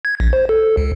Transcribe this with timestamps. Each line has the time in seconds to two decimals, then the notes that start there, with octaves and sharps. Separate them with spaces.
0.05 G#6
0.20 A#1
0.33 C5
0.49 A4
0.61 A4
0.77 C#2